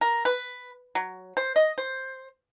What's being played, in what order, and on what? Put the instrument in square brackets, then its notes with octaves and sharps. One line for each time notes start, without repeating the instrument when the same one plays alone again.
[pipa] A#4
B4
F#3
C5
D#5
C5